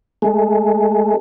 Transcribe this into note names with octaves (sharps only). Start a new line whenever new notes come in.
G#3 A3